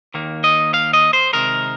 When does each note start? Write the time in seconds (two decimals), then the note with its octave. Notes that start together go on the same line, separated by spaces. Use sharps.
0.14 D#2 D#3 A#3
0.44 D#5
0.74 F5
0.93 D#5
1.13 C5
1.33 C3 D#3 G#3 A#4